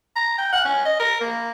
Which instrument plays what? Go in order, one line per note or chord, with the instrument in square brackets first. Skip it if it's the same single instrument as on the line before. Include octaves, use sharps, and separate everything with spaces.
[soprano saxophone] A#5
G5
F#5
C#4
D#5
A#4
A#3